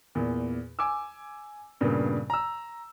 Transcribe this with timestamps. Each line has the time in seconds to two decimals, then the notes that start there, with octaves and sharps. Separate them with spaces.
0.15 E2 A#2
0.79 G#5 D6 E6
1.81 G2 A#2 C#3 B3
2.30 A#5 E6